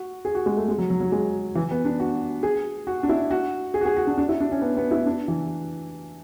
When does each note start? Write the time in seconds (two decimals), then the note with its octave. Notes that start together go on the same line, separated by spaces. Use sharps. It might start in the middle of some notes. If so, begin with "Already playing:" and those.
Already playing: F#4
0.25 G#4
0.35 F#4
0.46 G#3
0.57 A3
0.68 G#3
0.78 F#3
0.90 F#3
1.00 F#3
1.12 G#3
1.55 E3
1.71 B3
1.85 D4
2.00 F#4
2.43 G#4
2.87 F#4
3.03 D4
3.09 E4
3.31 F#4
3.74 G#4
3.81 F#4
3.85 G#4
3.97 F#4
4.07 D4
4.18 D4
4.29 E4
4.40 D4
4.52 C#4
4.62 B3
4.77 B3
4.91 E4
5.06 D4
5.28 E3